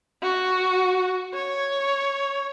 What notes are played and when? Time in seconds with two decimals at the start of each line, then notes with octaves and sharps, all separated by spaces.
0.23 F#4
1.34 C#5